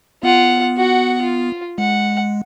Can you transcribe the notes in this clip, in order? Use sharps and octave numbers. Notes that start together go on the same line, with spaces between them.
B3 F4 F#5
F#4 F#5
F4
G#3 F#5